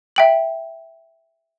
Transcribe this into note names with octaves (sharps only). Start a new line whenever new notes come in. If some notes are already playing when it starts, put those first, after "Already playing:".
E5 G5 F#7